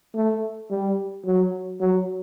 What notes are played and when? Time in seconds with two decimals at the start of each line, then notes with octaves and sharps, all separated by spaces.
0.15 A3
0.70 G3
1.25 F#3
1.80 F#3